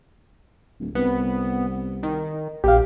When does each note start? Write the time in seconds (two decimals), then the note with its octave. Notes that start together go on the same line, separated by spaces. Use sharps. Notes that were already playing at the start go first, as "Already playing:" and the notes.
0.79 D1
0.95 C2 B3
2.03 D#3
2.64 A#1 G4 F5